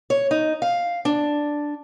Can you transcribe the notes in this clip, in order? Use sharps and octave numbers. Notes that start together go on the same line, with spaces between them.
C#5
D#4
F5
D4